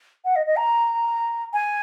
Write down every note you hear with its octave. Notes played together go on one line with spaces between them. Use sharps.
F#5
D#5
D#5
A#5
G#5